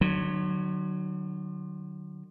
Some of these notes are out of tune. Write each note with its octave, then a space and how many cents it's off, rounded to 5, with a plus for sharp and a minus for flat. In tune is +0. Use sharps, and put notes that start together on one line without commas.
D3 +45 F#3 +0